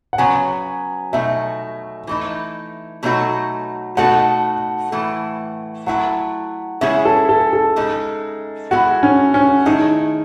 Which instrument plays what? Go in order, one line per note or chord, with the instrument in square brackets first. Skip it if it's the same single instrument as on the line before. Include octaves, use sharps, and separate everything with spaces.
[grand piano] F#5
[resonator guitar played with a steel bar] C#3 F#3 B3 [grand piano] G#5
[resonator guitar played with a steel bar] B2 F#3 A3 D#4 [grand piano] E5
[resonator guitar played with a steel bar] E3 A3 D#4
B2 F#3 A3 D#4 F#4
[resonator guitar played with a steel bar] B2 A3 D#4 F#4 A4 [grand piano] F#5
[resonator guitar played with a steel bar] A2 E3 A3
[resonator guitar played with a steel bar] F#3 A3 E4 [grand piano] F#5
[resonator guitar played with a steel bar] C#3 G#3 C#4 E4 G#4 [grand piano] E5
[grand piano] A4
A4
A4
[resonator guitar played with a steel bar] C#3 G#3 D#4
[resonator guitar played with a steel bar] G#3 B3 E4 G#4 [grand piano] F#4
[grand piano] C#4
C#4
[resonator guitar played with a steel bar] D#3 A3 E4 G#4 [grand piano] D#4